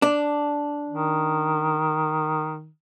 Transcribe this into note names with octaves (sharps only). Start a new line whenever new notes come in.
D4
D#3